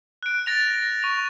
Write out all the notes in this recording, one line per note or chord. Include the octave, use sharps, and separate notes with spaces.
F#6 D7
A6 A#6 F7
C#6 F7